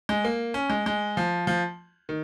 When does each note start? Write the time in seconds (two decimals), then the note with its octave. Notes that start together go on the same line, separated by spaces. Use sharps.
0.09 G#3
0.25 A#3
0.54 C#4
0.70 G#3
0.86 G#3
1.17 F3
1.47 F3
2.09 D#3